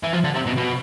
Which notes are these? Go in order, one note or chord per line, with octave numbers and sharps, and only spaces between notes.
E3
F3
D3
C3
B2
B2